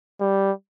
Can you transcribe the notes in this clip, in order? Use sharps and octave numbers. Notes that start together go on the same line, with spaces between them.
G3